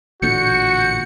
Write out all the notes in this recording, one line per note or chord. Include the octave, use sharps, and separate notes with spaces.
A1 A#2 D3 F#4 G6 C#7